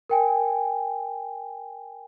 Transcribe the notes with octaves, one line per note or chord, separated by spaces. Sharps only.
A#4 G5 G#5